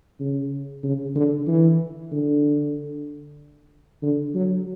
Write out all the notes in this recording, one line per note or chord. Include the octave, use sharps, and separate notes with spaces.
C#3
C#3
D3
E3
D3
D3
F#3